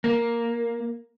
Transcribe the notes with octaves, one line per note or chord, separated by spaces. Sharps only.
A#3